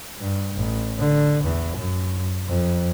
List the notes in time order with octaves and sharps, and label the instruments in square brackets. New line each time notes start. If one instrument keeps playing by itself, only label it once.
[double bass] G2
A1
D3
E2
F#2
F2